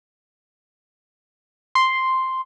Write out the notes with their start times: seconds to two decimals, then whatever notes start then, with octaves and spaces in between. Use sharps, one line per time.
1.75 C6